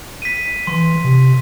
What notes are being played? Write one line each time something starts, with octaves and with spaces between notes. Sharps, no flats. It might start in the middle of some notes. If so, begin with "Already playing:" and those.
B6 D#7
E3 C6
C3